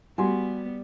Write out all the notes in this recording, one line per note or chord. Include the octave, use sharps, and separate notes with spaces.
G3 B3 F#4 G#5 C6